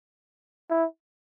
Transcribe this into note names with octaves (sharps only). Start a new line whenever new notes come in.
E4